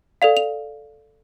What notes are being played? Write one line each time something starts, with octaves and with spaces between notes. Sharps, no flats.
A4 D5 F5 F7
F7